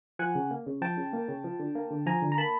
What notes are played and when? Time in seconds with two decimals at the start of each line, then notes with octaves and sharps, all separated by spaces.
0.19 F3 F#5 G#5
0.35 C#3
0.51 A#3
0.66 C#3
0.82 F3 G5 A5
0.97 C#3
1.13 A#3
1.28 C#3
1.44 F3
1.59 D3
1.75 A#3
1.91 D3
2.06 F3 G#5 A#5
2.22 D3
2.32 A#5
2.38 A#3 A5 B5